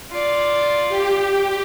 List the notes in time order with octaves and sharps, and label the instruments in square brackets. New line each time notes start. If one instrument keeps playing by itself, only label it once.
[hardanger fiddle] F4 D5
[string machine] G4